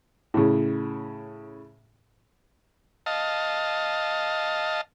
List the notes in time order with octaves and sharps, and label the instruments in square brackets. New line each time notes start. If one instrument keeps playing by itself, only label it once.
[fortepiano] A2 C#3
[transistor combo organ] D#5 F5 A5